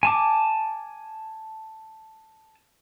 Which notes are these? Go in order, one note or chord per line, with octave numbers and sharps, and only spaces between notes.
G#5 A5 D6